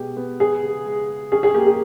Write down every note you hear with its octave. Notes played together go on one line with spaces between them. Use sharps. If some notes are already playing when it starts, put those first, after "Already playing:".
Already playing: B2 G#3 G4
B3
G#3 G#4
C#3
G#3
G#3
C#4 G#4
G#4
A#3 G4
G#4